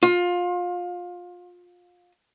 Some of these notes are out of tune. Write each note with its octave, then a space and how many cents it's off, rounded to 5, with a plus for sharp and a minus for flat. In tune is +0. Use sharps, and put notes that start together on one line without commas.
F4 +25